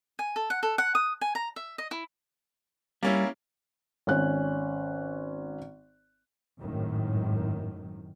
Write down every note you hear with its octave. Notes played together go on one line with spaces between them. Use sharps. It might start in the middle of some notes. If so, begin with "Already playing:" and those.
G#5
A4
F#5
A4
F#5
D#6
G#5
A#5
E5
D#5
E4
G3 A#3 C#4 E4
G#1 C#4 F#6
G#1 F#2 A2 D#3